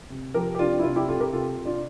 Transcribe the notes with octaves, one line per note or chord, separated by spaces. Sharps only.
C3
F3 G4 A#4
G4
C3 D4 F4
E4
C3 D4 F4
E4 G4
C3 F4 A4
G4 A#4
C3 F4 A4
C3
D4 F4